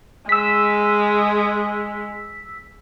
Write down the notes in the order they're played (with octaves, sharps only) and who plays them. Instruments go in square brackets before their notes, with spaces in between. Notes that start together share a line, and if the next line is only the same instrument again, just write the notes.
[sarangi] G#3 [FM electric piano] E6 B6